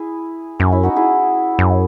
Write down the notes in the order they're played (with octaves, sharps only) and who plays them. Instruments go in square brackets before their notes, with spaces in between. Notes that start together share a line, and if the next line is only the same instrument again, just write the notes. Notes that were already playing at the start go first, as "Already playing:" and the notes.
Already playing: [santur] E4 G#4
[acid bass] F#2 [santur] C#4
[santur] E4
D#4 F#4
E4 G#4
[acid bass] F#2